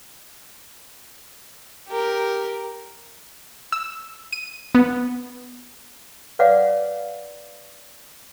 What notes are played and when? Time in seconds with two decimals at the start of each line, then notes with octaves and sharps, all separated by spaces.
1.88 G4 A#4
3.72 E6
4.32 D#7
4.75 B3
6.39 B4 C#5 D5 F5 F#5 D6